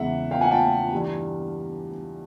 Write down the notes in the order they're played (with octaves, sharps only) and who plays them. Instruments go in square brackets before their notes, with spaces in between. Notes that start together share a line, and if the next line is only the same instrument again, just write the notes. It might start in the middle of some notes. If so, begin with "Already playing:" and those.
Already playing: [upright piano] E2 C#3 E3 G#3 E5 F#5
F5 G5
F#5 G#5
G5 A5
G2 E3 G3